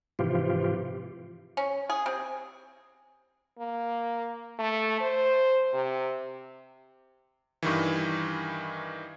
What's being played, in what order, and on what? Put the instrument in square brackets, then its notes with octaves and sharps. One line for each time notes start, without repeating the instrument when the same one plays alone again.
[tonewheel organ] G#2 C3 E3 F3 F4 G4
[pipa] C#4
G#4
C3
[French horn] A#3
A3
C5
C3
[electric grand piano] G2 D#3 E3